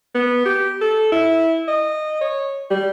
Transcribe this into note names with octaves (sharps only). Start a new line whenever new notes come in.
B3
G4
A4
E4
D#5
C#5
G3